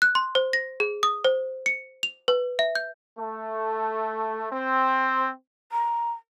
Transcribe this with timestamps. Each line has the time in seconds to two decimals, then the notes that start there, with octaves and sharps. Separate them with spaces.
0.02 F#6
0.15 C6
0.35 C5
0.53 A#6
0.80 G#4
1.03 D#6
1.25 C5
1.66 C#7
2.03 F7
2.28 B4
2.59 E5
2.75 G6
3.19 A3
4.52 C4
5.72 A#5